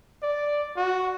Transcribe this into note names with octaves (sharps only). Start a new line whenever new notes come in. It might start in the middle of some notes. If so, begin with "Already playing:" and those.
D5
F#4